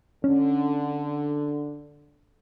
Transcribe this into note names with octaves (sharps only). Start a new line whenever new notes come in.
D3 C#4